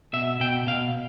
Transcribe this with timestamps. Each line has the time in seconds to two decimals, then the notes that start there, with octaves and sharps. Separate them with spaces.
0.13 B2 E5
0.40 B2 G5
0.67 B2 F5